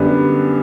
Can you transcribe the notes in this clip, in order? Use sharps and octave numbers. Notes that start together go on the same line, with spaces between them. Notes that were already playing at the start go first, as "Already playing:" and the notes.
Already playing: F#2 D3 G3 B3